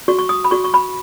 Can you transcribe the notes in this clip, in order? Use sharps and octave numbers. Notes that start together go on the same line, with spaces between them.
F#4 C#6
C#6
D#6
B5
F#4 C#6
C#6
B5